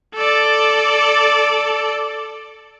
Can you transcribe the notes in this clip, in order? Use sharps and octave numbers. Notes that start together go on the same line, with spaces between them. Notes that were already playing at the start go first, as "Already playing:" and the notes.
A4 D5